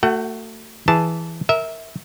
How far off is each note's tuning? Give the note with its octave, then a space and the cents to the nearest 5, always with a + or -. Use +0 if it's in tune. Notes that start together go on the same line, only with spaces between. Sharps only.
A3 +30 F#4 +0 F#5 +40
E3 +0 G#4 +0 A5 +0
A#4 -10 E5 -20